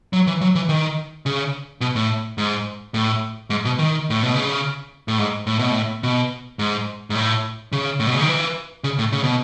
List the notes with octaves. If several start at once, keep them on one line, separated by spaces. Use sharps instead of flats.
F#3
E3
F#3
E3
D#3
C#3
B2
A2
G#2
A2
G#2
B2
D#3
A2
B2
C#3
A2
G#2
A2
B2
A2
B2
G#2
G#2
A2
C#3
A2
B2
C#3
D#3
E3
C#3
A2
C#3
B2